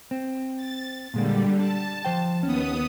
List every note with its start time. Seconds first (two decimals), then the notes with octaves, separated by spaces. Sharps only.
0.11 C4
0.56 A6
1.14 A#2 D3 G3 G#3 A#3
1.59 D4 A5
2.05 F3 C5 G5
2.43 D#2 B3 C#4 D#6